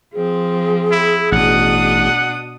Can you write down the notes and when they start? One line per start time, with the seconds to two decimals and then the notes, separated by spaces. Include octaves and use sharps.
0.14 F3 C4 G#4
0.91 E4
1.32 A1 B2 D4 F#5 D#6